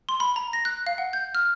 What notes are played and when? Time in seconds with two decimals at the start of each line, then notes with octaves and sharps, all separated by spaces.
0.09 C6
0.20 B5
0.36 A#5
0.53 A#6
0.65 F#6
0.87 F5
0.98 F#5
1.13 G6
1.35 F6